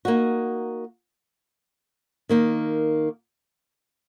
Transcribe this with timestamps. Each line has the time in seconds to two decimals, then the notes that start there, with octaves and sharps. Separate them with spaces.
0.05 A#3 D#4 F#4
2.29 D#3 A#3 D#4